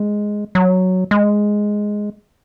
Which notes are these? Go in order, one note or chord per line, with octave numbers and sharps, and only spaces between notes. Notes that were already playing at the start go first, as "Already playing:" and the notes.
Already playing: G#3
F#3
G#3